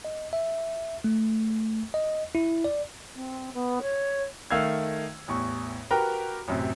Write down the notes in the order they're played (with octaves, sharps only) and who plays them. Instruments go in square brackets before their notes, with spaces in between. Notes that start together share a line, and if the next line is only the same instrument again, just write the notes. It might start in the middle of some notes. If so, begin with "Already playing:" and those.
[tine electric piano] D#5
E5
A3
D#5
E4
D5
[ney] C4
B3
C#5
[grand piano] D#3 A3 F5 E6 G#6
A1 E2 C#6
F#4 G4 A#4 B4 G5 A#5
A1 F#2 C3